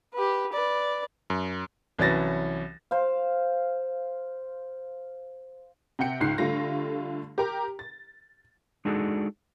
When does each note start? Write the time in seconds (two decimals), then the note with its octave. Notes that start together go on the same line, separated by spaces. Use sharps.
0.14 G4 B4
0.53 B4 D5
1.30 F#2
1.99 C2 E3 F#3 C#4 A6 A#6
2.91 C5 F5
5.99 C3 F#5 G5 C#7
6.20 C#2 G#2 C7
6.38 D3 G3 A3 F4 A#6
7.38 G4 A#4 A#5
7.79 A6
8.85 G#3 D4 D#4 F#4 G#4 A4